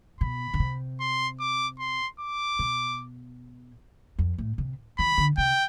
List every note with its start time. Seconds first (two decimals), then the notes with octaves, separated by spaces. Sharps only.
0.21 B2 B5
0.54 D3
0.60 C3
1.00 C6
1.40 D6
1.79 C6
2.20 D6
2.59 B2
4.19 F2
4.38 A2
4.58 C3
4.98 E3 B5
5.18 D3
5.38 C3 G5